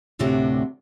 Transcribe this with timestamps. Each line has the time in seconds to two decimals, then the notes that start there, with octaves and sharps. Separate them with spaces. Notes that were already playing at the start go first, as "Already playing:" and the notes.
0.19 D2 A2 C3 D4 F#4 G4